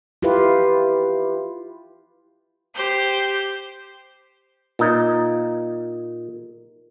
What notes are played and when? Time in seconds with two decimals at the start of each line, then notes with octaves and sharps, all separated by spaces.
0.22 E4 F4 G4 B4
2.75 G4 C5 G6
4.79 A#2 D#4